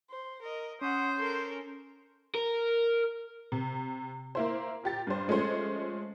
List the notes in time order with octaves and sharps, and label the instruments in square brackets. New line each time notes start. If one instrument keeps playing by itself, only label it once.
[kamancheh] C5
A#4 D#5
[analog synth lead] C#4 [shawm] C5 [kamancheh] F#5 D#6
[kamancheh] A4 A#4
[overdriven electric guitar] A#4
[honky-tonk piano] C3
A#3 E4 C5
A#2 G4 A6
G2 C5
F3 G#3 A3 C#4 C5